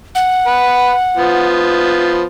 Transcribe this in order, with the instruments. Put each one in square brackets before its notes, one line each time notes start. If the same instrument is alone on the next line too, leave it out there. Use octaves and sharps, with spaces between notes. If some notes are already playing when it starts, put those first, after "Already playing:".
[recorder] F#5
[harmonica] B4
F3 B3